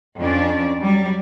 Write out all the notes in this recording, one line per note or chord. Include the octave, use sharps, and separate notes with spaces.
F2 C#4 D4 D5
F#3 G3